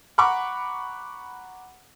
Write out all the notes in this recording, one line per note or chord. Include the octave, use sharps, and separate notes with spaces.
F#5 A#5 B5 C#6 D6